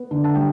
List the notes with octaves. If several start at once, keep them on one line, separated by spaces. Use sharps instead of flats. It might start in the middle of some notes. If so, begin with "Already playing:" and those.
Already playing: B3
D3
A5
G3 G5